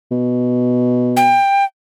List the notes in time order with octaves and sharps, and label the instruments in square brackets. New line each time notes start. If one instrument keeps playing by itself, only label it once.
[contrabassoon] B2
[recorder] G5